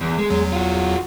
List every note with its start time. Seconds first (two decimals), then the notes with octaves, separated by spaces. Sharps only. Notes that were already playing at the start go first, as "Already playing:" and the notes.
0.01 E2
0.18 G#3
0.30 E2 F#3
0.52 F4 F#4